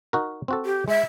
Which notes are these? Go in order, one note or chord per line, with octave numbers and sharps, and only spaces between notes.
D#4 F#4 A#4
C4 F#4 A4
G4
G#3 E5